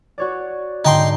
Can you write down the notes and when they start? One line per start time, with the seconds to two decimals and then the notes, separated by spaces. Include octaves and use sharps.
0.18 F#4 C#5 D5
0.85 G#2 D3 D#4 G5 C6